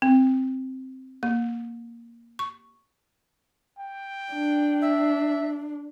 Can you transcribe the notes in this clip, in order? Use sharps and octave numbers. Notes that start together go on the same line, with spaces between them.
C4
A#3
C#6
G5
D4
E5